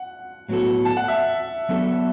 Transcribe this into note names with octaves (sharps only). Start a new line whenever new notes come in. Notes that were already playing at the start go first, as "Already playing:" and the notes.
Already playing: F#5
A2 F#3 B3 F#4 A4
A5
F#5
E5
F#3 B3 D4 A4